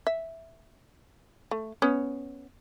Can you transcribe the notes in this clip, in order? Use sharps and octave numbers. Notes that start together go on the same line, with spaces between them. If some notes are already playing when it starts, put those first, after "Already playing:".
E5
A3
B3 C#4